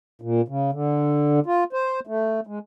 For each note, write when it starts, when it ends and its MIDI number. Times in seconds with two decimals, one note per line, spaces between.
0.22 0.41 46
0.48 0.71 49
0.72 1.40 50
1.46 1.64 65
1.73 2.00 72
2.07 2.40 57
2.47 2.59 56